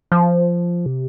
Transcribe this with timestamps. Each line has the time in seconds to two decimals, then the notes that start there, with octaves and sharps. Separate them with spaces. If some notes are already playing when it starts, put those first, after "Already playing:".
0.12 F3
0.86 C3